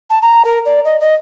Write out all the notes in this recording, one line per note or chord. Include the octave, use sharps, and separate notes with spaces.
A5
A#5
A#4
D5
D#5
D#5